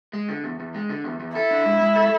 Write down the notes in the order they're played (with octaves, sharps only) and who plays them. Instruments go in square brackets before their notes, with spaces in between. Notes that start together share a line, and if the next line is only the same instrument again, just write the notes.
[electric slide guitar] G#3
D3
E2
E2
G#3
D3
E2
E2
[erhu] E4 [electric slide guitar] A4
[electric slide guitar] D4
G#3
G#3
A4